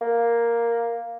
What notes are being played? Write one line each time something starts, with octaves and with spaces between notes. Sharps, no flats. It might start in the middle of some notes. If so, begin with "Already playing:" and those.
A#3